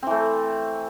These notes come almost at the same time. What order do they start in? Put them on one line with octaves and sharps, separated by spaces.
C4 E3 A3